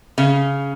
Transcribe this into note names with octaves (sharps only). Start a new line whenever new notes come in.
C#3